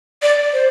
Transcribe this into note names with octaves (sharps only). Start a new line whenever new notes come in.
D5
C5